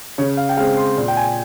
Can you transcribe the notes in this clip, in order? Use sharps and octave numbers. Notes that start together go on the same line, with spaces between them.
C#3 C#5
F5
G5
G#3 C4 F5
C6
A#2
G5
G#5